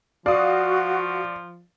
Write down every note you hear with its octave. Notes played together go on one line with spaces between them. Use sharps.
F3 F#4 D5 F5 D#6